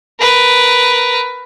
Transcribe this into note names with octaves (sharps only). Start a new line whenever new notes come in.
A#4 B4